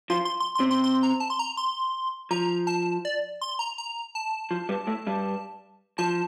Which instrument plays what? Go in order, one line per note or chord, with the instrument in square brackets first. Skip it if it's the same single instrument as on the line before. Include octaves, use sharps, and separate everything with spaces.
[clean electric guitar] F3 F4 [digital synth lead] C6
[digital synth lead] C6
C6
C6
[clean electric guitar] C3 C4
[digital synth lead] C6
C6
A#5
A5
C6
A#5
C6
[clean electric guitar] F3 [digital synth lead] A#5
[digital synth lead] A5
D5
C6
A#5
A#5
A5
[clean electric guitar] F3
G2 G3
A2 A3
G2 G3
[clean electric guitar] F3 [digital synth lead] A5